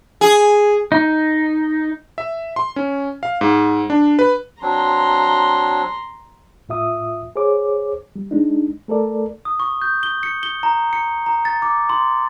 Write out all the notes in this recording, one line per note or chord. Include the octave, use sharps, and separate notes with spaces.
G#4
D#4
E5
C6
C#4
F5
G#2
D4
B4
F#3 C4 D4 A#5 C6
A2 F4 E5 D#6
G#4 C5 C#5 D6
G3
G#3 D4 D#4
A3 A4 A#4 D5
D#6
C#6
G6
G7
C#7
G7
A#5
C#7
A#5
A6
D6
C6